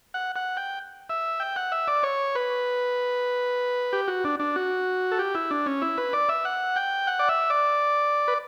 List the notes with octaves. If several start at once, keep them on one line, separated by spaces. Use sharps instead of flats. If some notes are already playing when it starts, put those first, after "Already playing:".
F#5
F#5
G5
E5
G5
F#5
E5
D5
C#5
B4
G4
F#4
D4
D4
F#4
A4
G4
E4
D4
C#4
E4
B4
D5
E5
F#5
G5
F#5
D5
E5
D5
B4